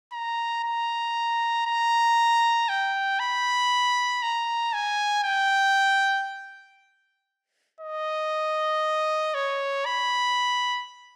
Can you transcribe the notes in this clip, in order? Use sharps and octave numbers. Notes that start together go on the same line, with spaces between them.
A#5
A#5
A#5
G5
B5
A#5
G#5
G5
D#5
C#5
B5